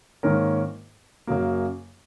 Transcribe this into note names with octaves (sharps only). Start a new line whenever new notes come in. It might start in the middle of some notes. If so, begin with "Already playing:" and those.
G#2 D#3 A#3 C#4 A#4
F#2 C#3 F#3 A#3